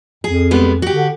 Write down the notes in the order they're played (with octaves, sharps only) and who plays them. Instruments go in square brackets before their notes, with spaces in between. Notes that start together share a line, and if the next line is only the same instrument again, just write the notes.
[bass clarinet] F2 [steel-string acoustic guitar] G#4
[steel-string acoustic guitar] G3 G#3 B3
F#4 G4
[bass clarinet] D3